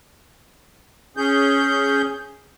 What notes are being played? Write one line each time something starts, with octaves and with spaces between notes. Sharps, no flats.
C#4 G#4 G6